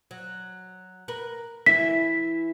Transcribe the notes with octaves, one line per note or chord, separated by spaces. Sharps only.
F#3
A#4 B4
E3 E4 E5 B6